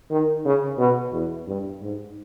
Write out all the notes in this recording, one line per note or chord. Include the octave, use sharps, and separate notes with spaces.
D#3
C#3
B2
E2
G2
G#2